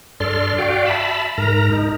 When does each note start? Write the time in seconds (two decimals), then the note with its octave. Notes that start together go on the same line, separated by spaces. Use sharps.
0.20 G2 A4 D5 C6 F6
0.58 F#4 D5 F5 G5
0.86 E5 A5 B5
1.38 G#2 A#4 A#5
1.72 D#4